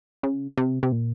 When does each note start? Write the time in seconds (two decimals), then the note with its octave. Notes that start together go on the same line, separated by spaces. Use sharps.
0.23 C#3
0.57 C3
0.83 C3
0.92 A#2